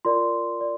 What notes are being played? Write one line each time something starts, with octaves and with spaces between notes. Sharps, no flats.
F4 A#4 D5 C6
D5